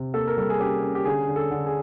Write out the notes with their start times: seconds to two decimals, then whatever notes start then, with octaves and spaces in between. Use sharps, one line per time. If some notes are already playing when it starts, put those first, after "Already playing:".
Already playing: C3
0.14 A#3 A4
0.28 A#4
0.37 G3 A4
0.50 G#4
0.60 C#4 G4
0.83 C#4
0.95 G4
1.05 D3 G#4
1.28 D3
1.36 A4
1.51 D3
1.66 G#4